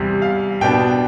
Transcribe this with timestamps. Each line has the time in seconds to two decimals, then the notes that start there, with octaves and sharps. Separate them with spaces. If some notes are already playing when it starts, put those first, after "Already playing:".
Already playing: E2 C3 G3
0.22 F5
0.61 B2 B3 D4 G5